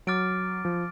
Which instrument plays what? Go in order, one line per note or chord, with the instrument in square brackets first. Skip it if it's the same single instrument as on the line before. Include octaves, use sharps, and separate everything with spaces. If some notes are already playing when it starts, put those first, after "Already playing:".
[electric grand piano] F#3 [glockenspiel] D6 F6 A6 D7
[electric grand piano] F3